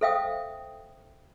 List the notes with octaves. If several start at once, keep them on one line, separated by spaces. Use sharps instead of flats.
A4 C5 E5 F5 G5 D#6